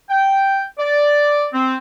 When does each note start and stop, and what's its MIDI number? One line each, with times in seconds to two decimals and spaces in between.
0.10 0.64 79
0.79 1.46 74
1.54 1.76 60